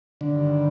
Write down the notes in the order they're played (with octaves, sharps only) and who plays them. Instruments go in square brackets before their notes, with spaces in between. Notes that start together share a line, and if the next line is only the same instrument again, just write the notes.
[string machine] G2 D#3 G3 [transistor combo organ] D3